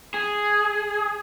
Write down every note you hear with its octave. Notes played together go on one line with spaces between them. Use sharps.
G#4